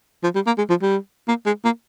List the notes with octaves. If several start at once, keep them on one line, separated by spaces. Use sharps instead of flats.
F3
G3
A#3
G#3
F3
G3
A#3
G#3
A#3